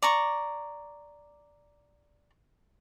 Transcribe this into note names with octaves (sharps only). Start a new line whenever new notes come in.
D5 A#5 C#6